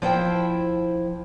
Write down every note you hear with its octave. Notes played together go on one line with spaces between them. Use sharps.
F3 E4 C5 G5